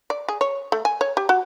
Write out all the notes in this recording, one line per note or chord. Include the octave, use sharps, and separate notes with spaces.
D5
G#4
C#5
A3
G#5
C#5
G4
F#4